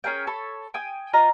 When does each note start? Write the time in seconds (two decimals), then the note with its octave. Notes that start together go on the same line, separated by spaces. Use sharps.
0.04 C#4 G#4 A#4 G5
0.27 A4 C#5 B5
0.74 G5 G#5 D#6
1.13 F4 D#5 A#5